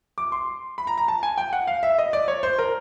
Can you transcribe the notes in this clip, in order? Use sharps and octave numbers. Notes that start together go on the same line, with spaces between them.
D6
C6
B5
A#5
A#5
A5
G#5
G5
F#5
F5
E5
D#5
D5
C#5
C5
A#4